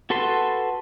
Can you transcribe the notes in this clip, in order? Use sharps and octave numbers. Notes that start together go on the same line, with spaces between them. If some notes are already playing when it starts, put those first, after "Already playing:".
F#4 A4 B4 A5 C6